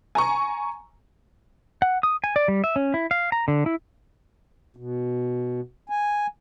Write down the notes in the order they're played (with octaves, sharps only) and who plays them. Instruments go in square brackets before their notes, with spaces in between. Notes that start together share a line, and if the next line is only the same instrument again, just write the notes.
[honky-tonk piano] G#5 A#5 C#6
[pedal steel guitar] F#5
D#6
G#5
D5
G3
E5
C#4
E4
F5
A#5
D3
E4
[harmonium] B2
G#5